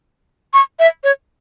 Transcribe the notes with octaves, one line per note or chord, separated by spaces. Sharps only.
C#6
E5
C#5